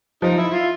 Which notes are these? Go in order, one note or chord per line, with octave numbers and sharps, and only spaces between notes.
F3 D#4
E4
F4